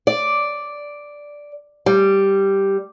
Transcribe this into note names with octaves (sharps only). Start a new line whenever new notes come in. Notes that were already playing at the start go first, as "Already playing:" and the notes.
D5
G3